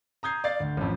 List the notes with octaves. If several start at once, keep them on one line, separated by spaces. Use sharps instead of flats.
A#5 D#6 G6 G#6 C7
D5 F5 A6 C7
D2
A1 F2